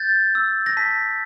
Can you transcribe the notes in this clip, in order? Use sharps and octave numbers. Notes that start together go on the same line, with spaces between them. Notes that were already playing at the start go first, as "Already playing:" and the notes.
Already playing: G6 A6
E6
A#6
A5 B6